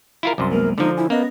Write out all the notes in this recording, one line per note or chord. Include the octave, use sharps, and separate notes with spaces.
E4 F4 A#4
C2 F#2 C6 D6
G#3 A#3 B3 A#4
D3 F3 D#4
E4 G#5
A#3 B3 C#4 D#5 A#6